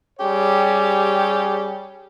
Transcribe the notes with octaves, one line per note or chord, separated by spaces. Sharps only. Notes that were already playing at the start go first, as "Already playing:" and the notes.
G3 C#4 G4 G#4 C#5